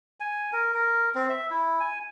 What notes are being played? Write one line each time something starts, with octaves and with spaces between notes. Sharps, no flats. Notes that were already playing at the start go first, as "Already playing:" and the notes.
G#5
A#4
A#4
C4
E5
E4
G#5